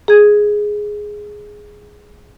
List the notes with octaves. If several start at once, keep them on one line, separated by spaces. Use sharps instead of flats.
G#4 G#6